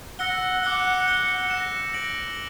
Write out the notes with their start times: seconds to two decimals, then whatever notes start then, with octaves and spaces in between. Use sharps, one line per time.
0.19 F#5 E6 A#6 C#7 G7
0.63 F#5 D6 F#6 C#7 G7
1.06 G6 C#7 G7
1.50 F#6 A#6 C#7 E7
1.93 A#6 D7 F#7